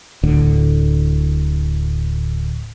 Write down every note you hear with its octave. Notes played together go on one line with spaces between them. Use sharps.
D1 D2 A2 D3